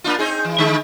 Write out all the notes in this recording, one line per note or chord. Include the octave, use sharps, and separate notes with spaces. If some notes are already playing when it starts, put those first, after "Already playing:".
A#3 D4 F4
C4 D#4 G#4
E3
D3 G#3